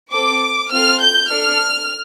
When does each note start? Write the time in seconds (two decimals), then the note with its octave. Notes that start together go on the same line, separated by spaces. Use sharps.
0.13 C4 A4 D6
0.72 C4 F4 A4 F6
1.01 G6
1.30 D4 A4 F6